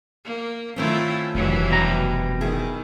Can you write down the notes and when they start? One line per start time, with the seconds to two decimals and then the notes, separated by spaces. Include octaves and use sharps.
0.25 A#3
0.76 D#3 A3 C4 C#4 E4 F4
1.35 F1 A#1 G2 E3 F#3
1.70 B2 G3 A#5
2.41 D#3 E4 G#4